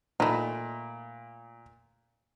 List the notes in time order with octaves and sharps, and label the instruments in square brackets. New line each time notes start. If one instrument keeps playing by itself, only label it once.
[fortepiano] A#2 B5 [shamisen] A3 D#4